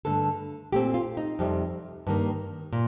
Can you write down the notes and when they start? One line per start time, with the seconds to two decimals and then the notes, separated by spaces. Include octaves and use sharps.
0.05 G2 D3 A3 A4
0.72 A#2 A3 C4 G4
0.94 F4
1.17 D#4
1.39 F2 C3 G3
2.07 G2 D#3 A#3
2.73 A#2